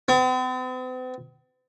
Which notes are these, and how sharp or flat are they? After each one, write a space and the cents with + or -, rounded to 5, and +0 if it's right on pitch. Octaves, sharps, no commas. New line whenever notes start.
C4 -45